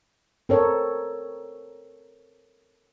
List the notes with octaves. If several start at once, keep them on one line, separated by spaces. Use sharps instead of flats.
C4 A4 A#4 C#5